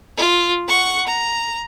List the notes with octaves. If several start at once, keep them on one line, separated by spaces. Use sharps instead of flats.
F4
F#5 C#6
A#5